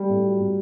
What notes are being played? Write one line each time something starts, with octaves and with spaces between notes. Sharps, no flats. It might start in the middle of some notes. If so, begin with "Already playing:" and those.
Already playing: G3
A2
F#3
A2